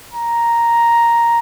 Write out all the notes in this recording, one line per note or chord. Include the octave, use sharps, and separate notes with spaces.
A#5